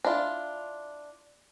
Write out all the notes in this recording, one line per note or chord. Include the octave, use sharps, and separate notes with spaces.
D4 E4 F4